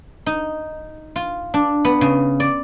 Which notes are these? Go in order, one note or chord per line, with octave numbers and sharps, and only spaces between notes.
D#4
F4
D4
B3
C#3
D5